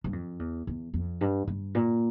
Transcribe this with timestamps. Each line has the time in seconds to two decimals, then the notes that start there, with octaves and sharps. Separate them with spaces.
0.04 G2
0.13 F2
0.39 E2
0.67 E2
0.94 F2
1.21 G2
1.48 G2
1.75 A#2